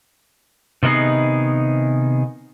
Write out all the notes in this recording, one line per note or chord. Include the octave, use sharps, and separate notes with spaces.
C3 D#3 B3 D#4 G#4